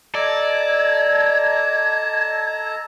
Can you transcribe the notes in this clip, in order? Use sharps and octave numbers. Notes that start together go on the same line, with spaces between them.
A4 D5 D#5 A5 A#5 G#6